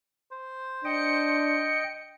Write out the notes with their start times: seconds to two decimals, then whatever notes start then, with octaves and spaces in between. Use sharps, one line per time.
0.31 C5
0.85 D4 D#5 G5 C#7